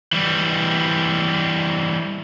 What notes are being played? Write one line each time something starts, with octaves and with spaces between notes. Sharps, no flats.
E3 G3